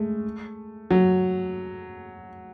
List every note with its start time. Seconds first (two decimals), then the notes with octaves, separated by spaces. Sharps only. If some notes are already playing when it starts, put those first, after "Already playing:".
Already playing: G#3 A3
0.91 F#3